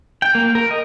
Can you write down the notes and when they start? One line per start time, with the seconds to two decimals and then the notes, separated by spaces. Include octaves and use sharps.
0.22 G5
0.35 A#3
0.55 A#4
0.71 D#5